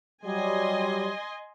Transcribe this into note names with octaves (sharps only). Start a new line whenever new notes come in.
F#3 G3 D#5 G#5 C6